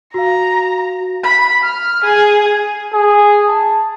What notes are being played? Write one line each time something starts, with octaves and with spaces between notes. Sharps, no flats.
F#4 F5 A#5
B5
F6
G#4
G#4
A5